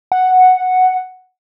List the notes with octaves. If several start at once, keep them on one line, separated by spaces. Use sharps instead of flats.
F#5